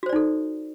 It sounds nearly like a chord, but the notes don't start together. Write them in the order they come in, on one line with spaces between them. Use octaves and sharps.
F#4 C5 D5 D#4 A4